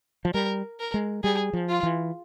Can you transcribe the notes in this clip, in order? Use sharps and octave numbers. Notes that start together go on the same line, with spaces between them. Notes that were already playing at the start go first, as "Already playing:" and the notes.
F3
G3 A#4
A#4
G#3
G3 G#4
F3
F4
E3